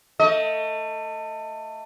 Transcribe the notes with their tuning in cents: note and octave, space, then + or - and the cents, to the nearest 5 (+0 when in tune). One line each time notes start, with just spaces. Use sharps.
A3 +25 D#5 +25